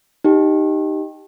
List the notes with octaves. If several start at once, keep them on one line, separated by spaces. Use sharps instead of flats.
D#4 G4